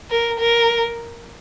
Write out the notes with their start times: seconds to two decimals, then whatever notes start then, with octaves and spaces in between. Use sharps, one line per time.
0.10 A#4
0.39 A#4